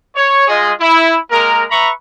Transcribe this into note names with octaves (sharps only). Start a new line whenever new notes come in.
C#5
G#3 F4 G#4 D#5
E4
G#3 A#3 A#4
B4 E5 A#5 B5 C#6